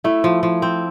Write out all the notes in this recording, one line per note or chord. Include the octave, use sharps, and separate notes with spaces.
A3 E4
F3
F3
C4